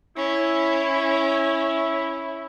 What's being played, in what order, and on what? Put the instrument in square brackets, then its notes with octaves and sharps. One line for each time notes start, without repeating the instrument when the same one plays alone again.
[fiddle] C#4 [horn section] E4